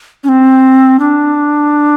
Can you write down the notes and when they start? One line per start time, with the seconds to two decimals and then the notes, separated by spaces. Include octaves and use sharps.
0.24 C#4
0.29 C4
1.00 D4